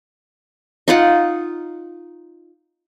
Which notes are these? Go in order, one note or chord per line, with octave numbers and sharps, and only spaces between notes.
D#4 F4 F#5